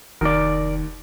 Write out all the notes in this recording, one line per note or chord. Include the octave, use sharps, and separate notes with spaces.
F1 D#2 D#3 A#4 D5